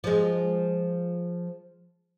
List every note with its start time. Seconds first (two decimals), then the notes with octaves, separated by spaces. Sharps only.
0.04 F3 G#3